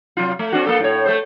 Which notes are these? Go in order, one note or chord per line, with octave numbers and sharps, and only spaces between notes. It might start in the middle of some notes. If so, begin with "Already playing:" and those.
C3 F#3 F4
A3
C4 D4 F#4
A#3 A4
A2 C#5
A3 A4 C5